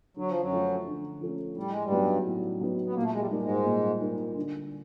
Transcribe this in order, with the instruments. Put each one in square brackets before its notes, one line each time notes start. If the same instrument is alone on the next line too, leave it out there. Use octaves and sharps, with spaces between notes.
[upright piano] D3 [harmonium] F#3
[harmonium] F3
F#2 F#3
[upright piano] F3 A3 C#4
D3
F3 A3 C#4
[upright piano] A2 [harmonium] G3
[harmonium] G#3
G2 G3
[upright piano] F#3 B3 D#4
A2
F#3 B3 D#4
[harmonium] B3
[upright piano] A#2 [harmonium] A#3
[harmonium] A3
G#3
G2 G3
[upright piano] G3 A#3 D#4
[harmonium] G#2 G#3
[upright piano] A#2
G3 A#3 D#4
D3